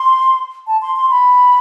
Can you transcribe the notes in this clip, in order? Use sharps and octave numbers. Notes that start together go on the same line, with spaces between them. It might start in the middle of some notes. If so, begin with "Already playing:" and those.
Already playing: C6
A5
C6
C6
B5